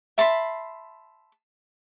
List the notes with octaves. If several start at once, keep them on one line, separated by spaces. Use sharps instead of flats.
E5 A5 B5 C6